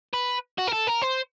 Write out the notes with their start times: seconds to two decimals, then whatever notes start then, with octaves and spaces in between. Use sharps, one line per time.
0.13 B4
0.58 F#4
0.68 A#4
0.73 A4
0.88 A#4
1.02 C5